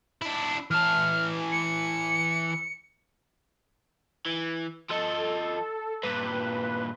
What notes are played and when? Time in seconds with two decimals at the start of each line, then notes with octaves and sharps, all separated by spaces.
0.22 D4 E4
0.71 E3 A5 F6
1.52 C#7
4.26 E3
4.90 F3 A4 D#5
6.03 G2 A#2 B4